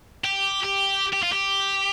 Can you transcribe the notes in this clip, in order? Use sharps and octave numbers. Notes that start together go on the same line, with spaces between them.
G4
G4
G4
F4
G4